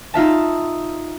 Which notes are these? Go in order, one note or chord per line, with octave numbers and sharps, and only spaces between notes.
D#4 F4 E5 A5